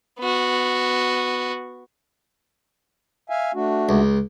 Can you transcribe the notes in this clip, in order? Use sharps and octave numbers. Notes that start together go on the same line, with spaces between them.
B3 F#4
E5 F5 G#5
A3 D4 F#4
C#2